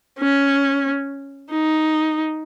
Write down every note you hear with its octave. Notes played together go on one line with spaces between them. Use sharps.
C#4
D#4